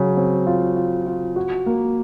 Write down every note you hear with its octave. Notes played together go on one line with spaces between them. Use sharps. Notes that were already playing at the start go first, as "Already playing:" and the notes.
Already playing: C#3 F#3
C4
F4
F4
F4
F#4
A#3